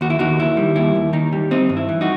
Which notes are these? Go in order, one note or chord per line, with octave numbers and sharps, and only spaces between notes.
D#2 F#4
E4
D#2 D#4 F#4
D#3 E4
G3
D#2 E4
D#2
D#3 D#4
G3
C4 D#4
G2
E4
E3
D#4 F#4